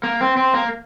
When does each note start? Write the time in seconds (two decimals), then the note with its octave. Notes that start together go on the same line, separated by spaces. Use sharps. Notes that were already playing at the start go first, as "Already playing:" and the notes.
0.03 A#3
0.21 C4
0.37 C4
0.54 A#3